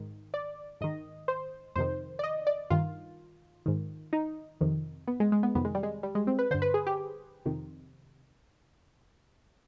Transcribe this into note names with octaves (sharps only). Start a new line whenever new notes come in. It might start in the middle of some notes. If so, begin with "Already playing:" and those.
Already playing: G#2 D#3
D5
G#2 D#3 D#5
C5
F2 C3 D#3 C5
D5
D#5
D5
G2 D#3 F4
G#2 D#3
D#4
F2 C3 D#3
B3
G#3
G#3
B3
F2 C3 D#3 B3
G#3
G3
G#3
G3
G#3
C4
B4
G2 D3 C5
B4
G#4
G4
F2 C3 D#3